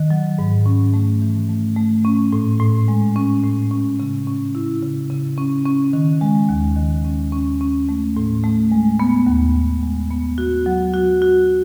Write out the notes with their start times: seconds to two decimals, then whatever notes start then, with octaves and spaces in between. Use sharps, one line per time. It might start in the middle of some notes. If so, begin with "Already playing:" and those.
Already playing: D#3
0.10 F#3
0.39 G#2
0.66 C#4
0.94 A3
1.21 E3
1.49 A3
1.77 A3
2.05 C#4
2.33 A2
2.60 A2
2.88 G#3
3.16 C#4
3.44 A2
3.71 C#4
4.00 C#3
4.27 C#4
4.55 E4
4.83 C#3
5.10 C#3
5.37 C#4
5.66 C#4
5.93 D#3
6.21 G#3
6.49 D#2
6.77 D#3
7.05 C#4
7.32 C#4
7.61 C#4
7.89 A3
8.17 A2
8.44 A3
8.72 G#3
9.00 B3
9.27 D#2
9.55 D#2
9.83 G#3
10.10 B3
10.38 F#4
10.66 F#3
10.94 F#4
11.22 F#4